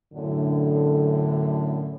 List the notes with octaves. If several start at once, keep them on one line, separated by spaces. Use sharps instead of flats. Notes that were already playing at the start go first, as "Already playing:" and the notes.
F#2 A2 D3